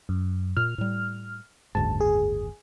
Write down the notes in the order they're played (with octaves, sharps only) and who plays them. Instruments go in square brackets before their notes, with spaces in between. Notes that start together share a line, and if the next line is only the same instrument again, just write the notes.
[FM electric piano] F#2
[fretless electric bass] A#2 [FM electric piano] F6
[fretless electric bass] A2 G3
[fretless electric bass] F#1 D2 G#2 [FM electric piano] A5
[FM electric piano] G#4